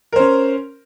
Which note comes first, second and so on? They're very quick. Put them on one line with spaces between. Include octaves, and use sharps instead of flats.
A#4 C5 C#4